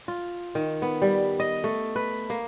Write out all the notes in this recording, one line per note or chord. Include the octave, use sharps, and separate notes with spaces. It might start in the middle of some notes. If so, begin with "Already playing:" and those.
F4
D#3
B3
G3
D#5
A3
B4
A#3